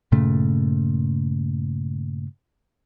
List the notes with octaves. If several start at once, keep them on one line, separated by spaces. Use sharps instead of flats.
G2 A#2 C#3 A3